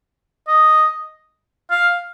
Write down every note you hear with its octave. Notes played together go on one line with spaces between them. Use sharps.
D#5
F5